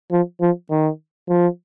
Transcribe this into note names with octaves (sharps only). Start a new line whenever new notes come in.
F3
F3
D#3
F3